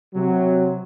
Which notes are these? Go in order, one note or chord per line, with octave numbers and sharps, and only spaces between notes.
C3 F#3